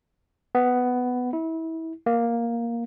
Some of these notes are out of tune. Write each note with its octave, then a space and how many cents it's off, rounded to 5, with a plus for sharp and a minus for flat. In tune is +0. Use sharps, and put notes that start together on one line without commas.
B3 +10
E4 -30
A#3 +5